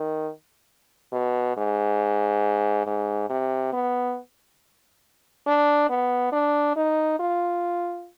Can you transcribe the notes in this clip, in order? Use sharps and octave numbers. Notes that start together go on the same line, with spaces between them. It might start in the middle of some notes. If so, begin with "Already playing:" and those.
Already playing: D#3
B2
G#2
G#2
C3
B3
D4
B3
D4
D#4
F4